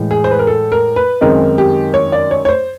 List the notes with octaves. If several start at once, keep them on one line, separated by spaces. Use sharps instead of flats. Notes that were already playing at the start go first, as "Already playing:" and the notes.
Already playing: A2 E3 G#3
G#4
C5
B4
A#4
A4
A#4
B4
F#2 D#3 G#3 C4 D#4 A#4
G4
C#5
D5
C#5
C#5
C5